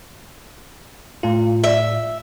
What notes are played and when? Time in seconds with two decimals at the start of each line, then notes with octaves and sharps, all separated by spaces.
1.23 A2 F4
1.64 E5